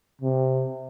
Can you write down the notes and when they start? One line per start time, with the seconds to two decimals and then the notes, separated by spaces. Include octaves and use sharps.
0.21 C3